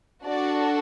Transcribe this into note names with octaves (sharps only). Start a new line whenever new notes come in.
D4 F#4 A4 D5